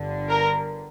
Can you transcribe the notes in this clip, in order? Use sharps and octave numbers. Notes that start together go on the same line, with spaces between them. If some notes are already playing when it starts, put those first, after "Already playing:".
Already playing: G1 G2 D3
A#4